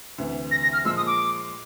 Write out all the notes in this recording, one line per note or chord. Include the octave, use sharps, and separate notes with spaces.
D2 C3 E3
A#6
A#6
F6
A#2 F3 G#3 E6
D#6
D6